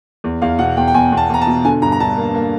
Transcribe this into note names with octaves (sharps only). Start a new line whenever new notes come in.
E2
E2 F5
B2 F#5
E2 G5
G5
E2 G#5
E2
A5
E2 A#5
A5
B2
D3 G#5
G2 A#5
A#5
G2 A5
A#3
A#3